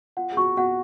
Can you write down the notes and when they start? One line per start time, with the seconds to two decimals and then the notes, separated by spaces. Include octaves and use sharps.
0.17 F4 F#5
0.32 G#4
0.37 F#4 C#6
0.57 F#4 F#5